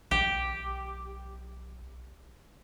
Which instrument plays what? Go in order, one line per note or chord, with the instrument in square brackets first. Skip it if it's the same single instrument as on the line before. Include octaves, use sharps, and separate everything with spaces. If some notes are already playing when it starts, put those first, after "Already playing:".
[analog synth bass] B1 [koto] G4